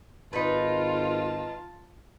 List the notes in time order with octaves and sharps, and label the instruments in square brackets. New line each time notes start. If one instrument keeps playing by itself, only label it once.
[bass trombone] G#1 [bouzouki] D#4 B4 [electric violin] F4 [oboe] A5